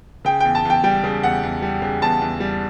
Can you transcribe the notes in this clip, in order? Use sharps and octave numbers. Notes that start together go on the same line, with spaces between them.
C#3 G5
E2 G5
A5
E2 G5
G3 G5
C#3
E2 F#5
E2
G3
C#3
E2 A5
E2
G3